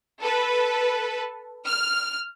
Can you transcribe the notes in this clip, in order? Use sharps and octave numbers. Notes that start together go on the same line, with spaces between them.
A4 B4
F6